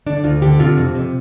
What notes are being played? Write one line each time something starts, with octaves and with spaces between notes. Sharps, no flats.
D3 D4
D2 F4
D3 G4
C3 F4
F2
C3